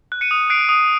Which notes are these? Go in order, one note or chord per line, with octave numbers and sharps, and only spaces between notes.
F#6
C#7 D#7
D#6
F#6 C7 D7
D#6